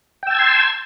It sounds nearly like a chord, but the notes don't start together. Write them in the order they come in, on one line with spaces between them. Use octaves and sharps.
G5 E6 A5 G#6 C6